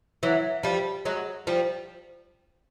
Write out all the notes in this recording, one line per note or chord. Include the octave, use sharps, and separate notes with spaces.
E3 F#3
F3 G3
F#3 G#3
F3 G3